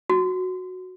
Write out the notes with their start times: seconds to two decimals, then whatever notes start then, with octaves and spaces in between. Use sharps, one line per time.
0.10 F#4